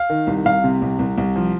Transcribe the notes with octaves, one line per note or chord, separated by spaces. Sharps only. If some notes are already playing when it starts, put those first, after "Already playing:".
Already playing: F5
D#3
C2
C2 F5
C3
C2
C2
C2
F3